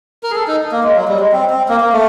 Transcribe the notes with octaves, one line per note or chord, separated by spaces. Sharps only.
A#4
G#4
A4
D#4
A#3
G#3
F#3
G3
G#3
C4
C4
A#3
A#3
A3